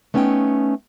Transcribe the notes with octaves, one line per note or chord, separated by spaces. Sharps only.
A3 B3 C#4 D#4 D#5 G5